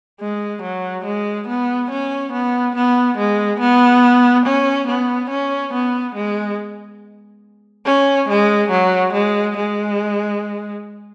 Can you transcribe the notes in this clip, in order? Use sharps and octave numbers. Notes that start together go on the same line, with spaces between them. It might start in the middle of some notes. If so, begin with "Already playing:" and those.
G#3
F#3
G#3
B3
C#4
B3
B3
G#3
B3
C#4
B3
C#4
B3
G#3
C#4
G#3
F#3
G#3
G#3